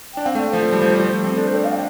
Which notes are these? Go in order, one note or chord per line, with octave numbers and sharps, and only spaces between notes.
D4 G5
C4 F5
A3
D5
F3 C5
A3
G3
F3
G3
F3
A3
C4
D4 A4
C5
D5
F5
G5